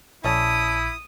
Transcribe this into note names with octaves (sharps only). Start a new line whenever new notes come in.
A#1 C#4 E4 A4 D5 D#6